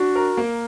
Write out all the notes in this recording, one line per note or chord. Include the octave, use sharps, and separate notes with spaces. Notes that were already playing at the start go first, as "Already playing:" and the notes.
Already playing: D4 F#4
A#4
A#3